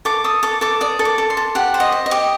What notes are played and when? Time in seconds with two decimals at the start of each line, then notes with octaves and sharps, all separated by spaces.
0.05 A4 D6
0.24 A4 D#6
0.43 A4 D6
0.61 A4 D6
0.81 D5 D#6
0.99 A4
1.05 D6
1.18 A4
1.30 C6
1.37 A4
1.55 G4 F#5
1.74 C5
1.80 D#5
1.92 D#5
2.06 D#5
2.11 G4